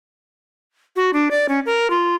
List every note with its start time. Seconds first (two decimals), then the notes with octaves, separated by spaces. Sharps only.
0.96 F#4
1.13 D4
1.31 D5
1.49 C#4
1.66 A#4
1.90 F4